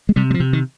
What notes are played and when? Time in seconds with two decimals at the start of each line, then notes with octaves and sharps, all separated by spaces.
0.09 G#3
0.16 C3 G3
0.30 G3
0.34 F3
0.40 C3
0.53 D#3